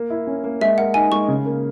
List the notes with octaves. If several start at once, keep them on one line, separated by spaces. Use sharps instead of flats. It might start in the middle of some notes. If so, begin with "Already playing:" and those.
Already playing: A#3
E4
C#4
A#3
G#3 E5
A#4 F#5
D#4 G#5
G#3 C#6
C#3
A#3